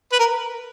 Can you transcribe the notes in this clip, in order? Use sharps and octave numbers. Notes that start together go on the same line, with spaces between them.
B4
A#4